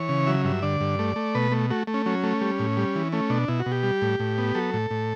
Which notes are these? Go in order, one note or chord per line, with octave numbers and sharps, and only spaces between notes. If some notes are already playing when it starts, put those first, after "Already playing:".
Already playing: E3 C#5
C#3
F#3 E5
G2 E5
D3 D5
G2
A3
A3
B2 B4
A3
A3 F#4
A3
C#4
F#3 C#4
A3
G3
A2
G3
E3
A3 C#4
B2 D4
B2 E4
F#4
B2
G4
G3
A2
A2
B3
F#3 A4
A2
A2